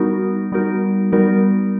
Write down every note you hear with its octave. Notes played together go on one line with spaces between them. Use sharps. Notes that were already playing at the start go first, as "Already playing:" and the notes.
Already playing: G3 B3 D#4 F#4 A#4
G3 B3 D#4 F#4 A#4
G3 B3 D#4 F#4 A#4